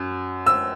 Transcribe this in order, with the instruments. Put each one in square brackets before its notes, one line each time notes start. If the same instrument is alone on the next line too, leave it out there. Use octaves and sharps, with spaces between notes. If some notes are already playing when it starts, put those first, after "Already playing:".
Already playing: [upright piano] F#2
E6